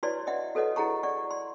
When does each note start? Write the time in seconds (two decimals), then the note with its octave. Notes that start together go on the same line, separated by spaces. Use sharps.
0.03 E4 F#4 B4 C#5 D5 C6
0.27 D#5 E5 F#5
0.55 F#4 A4 B4 C#5 D#5 F#5
0.76 E4 G#4 F#5 A#5 C#6
1.03 D5 F#5 C#6
1.31 C6